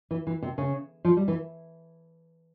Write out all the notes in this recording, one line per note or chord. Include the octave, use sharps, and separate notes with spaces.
E3
E3
C3
C#3
F3
G3
E3